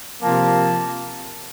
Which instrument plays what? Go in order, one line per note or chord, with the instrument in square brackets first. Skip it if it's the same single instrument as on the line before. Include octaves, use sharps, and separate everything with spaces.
[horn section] C3 F3 A#3 A5